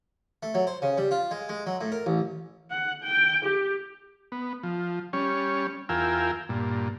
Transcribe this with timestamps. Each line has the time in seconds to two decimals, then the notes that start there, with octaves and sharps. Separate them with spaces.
0.43 A3
0.54 F#3
0.67 C5
0.82 C#3
0.98 G3
1.11 F4
1.31 G#3
1.49 G#3
1.66 F#3
1.81 A2
1.92 A#4
2.06 A1
2.71 F#5
3.04 G5
3.45 G4
4.32 B3
4.63 F3
5.13 G3 C#4 C#5
5.89 E2 F4 A#4 G5 G#5 E6
6.49 G2 A#2